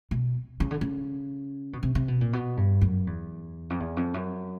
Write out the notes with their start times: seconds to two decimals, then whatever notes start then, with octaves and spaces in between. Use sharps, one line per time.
0.11 B2
0.60 C#3
0.71 D3
0.81 C#3
1.73 B2
1.83 C3
1.95 C3
2.08 B2
2.21 A#2
2.33 B2
2.57 G2
2.81 F#2
3.07 E2
3.70 F2
3.80 E2
3.97 F2
4.14 F#2